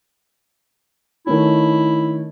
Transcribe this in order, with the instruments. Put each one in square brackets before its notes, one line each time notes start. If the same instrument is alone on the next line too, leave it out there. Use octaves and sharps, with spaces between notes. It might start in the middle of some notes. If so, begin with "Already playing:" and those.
[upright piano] D#3 A3 C#4 [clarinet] E4